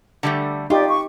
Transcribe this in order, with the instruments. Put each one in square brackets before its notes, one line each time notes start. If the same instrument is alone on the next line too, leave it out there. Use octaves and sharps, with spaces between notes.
[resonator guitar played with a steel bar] D3 G3 A3
[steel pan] D#4 G4 [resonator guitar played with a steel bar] F4 [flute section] D5
[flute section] C#6